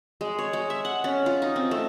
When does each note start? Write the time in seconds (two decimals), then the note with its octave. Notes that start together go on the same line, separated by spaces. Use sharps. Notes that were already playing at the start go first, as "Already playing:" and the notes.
0.21 G#3
0.39 C#5
0.53 G#3
0.70 E5
0.85 F#5
1.04 C#4
1.26 F4
1.42 D#4
1.56 C4
1.71 A3